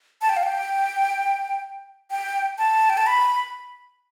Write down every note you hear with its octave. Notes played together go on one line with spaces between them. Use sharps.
A5
G5
F5
G5
G5
A5
G5
A5
B5